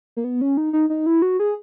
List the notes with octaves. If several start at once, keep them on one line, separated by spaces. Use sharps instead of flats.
A#3
B3
C#4
D#4
D#4
D#4
E4
F#4
G#4